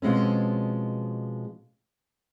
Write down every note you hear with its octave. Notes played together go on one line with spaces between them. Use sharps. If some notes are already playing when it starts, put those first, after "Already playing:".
B2 F3 G#3 C4 C#4